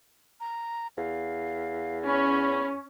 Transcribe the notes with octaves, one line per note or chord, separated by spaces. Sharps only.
A#5
E2 F5
C#4 B5